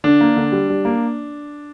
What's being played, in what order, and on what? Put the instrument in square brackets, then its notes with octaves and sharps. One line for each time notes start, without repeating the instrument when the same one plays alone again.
[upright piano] D3 [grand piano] D4
[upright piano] A#3
D3
G3
G3
A#3